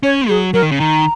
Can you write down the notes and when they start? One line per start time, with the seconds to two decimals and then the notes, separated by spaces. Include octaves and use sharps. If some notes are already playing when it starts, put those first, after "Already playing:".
0.03 C#4 C#5
0.29 F#3 G#4
0.54 F#3 A#4
0.62 D#3
0.71 C#3
0.79 D#3 A#5